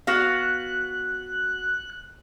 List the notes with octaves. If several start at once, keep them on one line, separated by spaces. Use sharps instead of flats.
B3 F#4 F5 F#6